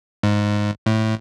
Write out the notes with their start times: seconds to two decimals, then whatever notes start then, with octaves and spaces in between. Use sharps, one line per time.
0.23 G#2
0.86 A2